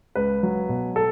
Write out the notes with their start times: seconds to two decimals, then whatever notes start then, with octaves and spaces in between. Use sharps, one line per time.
0.15 C#2 B4
0.43 F#3
0.69 B2
0.96 A4